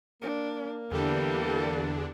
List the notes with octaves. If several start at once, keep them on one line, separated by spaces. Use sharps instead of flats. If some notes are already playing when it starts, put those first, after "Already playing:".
A#3 D4
E2 D3 E3 G3 D4 G4 A4